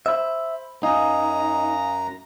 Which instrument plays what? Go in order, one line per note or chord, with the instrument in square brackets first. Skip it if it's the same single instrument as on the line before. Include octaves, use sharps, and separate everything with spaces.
[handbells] C5 B5 [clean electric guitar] E5
[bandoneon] F#2 A#5 [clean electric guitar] D#4 [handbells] F5 G#5 D#6